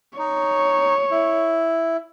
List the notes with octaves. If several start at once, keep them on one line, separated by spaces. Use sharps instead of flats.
D#4 C#5
E4